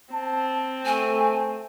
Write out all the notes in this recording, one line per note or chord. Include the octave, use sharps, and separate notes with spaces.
C4 A5
A3 G#5